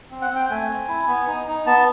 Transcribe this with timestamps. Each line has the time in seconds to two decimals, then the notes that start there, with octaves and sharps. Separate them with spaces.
0.11 C4
0.22 F#5
0.30 C4 G5
0.50 A3 G#5
0.69 C4
0.88 E4
1.07 B3
1.27 D#4
1.47 D#4
1.66 B3 A5